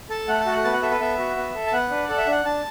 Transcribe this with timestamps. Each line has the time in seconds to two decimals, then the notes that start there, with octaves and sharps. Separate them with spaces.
0.10 A4 A5
0.28 A3 F#5
0.40 A5
0.46 F#4
0.52 F#5
0.64 B3 A5
0.73 F#5
0.82 A4 E5
0.91 B4
1.00 B3 E5
1.19 F#4
1.36 B3
1.55 A4
1.67 A5
1.72 B3 F#5
1.91 D4 B4
2.04 D5
2.09 A4
2.18 E5
2.27 D4 F#5
2.45 D4 A5